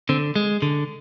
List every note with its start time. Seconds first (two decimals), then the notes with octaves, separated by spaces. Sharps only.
0.09 D3 C4
0.36 G#3
0.62 D3